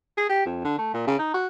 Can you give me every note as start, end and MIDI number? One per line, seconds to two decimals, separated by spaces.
0.17 0.27 68
0.29 0.45 67
0.46 0.62 41
0.65 0.77 50
0.78 0.91 57
0.94 1.07 46
1.07 1.16 49
1.19 1.33 63
1.34 1.47 66